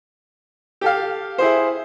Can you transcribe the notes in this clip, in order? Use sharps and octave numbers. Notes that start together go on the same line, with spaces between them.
G4 A4 F5
E4 G#4 C5